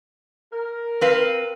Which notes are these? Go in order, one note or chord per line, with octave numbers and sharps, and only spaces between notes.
A#4
C4 B4 F5